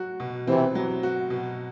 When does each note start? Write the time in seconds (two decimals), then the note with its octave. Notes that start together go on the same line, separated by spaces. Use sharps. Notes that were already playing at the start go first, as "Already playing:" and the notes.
Already playing: F#3 F#4
0.20 B2
0.47 C3 E3 C4
0.75 F#3
1.03 F#4
1.30 B2